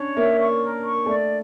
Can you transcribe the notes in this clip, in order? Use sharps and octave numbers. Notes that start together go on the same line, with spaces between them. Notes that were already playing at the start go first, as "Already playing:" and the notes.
Already playing: C#4 D4 C#5
A#3 E5
C#6
A#4
C#6
A3 D5